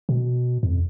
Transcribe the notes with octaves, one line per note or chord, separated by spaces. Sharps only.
B2
F2